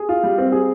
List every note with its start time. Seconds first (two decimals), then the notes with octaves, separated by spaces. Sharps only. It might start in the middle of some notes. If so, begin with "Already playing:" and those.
Already playing: G#4
0.09 F4
0.23 G3
0.38 C4
0.52 G#4